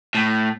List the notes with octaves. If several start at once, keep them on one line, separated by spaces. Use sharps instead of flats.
A2